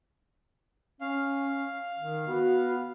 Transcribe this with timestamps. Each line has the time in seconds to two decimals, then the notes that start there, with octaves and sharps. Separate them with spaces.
1.01 C#4 F5
1.99 D#3
2.28 B3 F#4